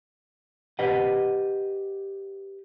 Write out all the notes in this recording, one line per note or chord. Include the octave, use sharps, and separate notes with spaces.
G4 B4 D#5 F#5